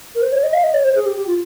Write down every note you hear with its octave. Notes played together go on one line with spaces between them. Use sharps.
A#4
C5
C#5
D#5
F5
D#5
C#5
C5
G#4
G4
G4
F4